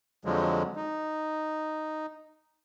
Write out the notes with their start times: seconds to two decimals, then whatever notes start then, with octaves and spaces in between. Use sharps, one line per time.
0.25 F2 D3 F3 F#3 G#3
0.76 D#4